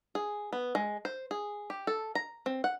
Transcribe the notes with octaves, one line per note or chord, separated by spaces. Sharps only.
G#4
B3
G#3
C5
G#4
G4
A4
A#5
C4
F#5